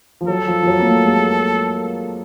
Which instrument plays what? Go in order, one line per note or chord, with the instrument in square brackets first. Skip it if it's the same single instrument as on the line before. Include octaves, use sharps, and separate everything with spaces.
[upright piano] F3
[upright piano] F#3 [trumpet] A4
[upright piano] F3
F3
F#3
A#3
A3
G#3